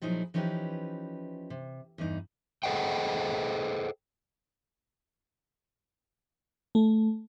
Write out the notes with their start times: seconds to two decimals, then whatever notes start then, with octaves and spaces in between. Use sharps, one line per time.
0.02 A#2 F3 F#3 D#4 E4 G#4
0.34 E3 F3 C#4 D#4 G4 B4
1.50 C3
1.98 E2 G2 E3 D#4
2.63 G#4 A4 C5 D#5 F#5 G5
6.75 A3